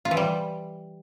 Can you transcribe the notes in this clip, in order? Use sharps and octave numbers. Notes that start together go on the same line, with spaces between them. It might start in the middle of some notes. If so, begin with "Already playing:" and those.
F4
E3
G3